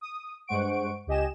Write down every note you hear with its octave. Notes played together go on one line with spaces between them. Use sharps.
D#6
G2 G#3 C5 F#5 C#6 D7
C#2 G4 D#5 G#5 E7